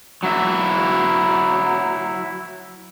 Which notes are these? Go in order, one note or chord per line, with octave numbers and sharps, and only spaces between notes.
F#3 E4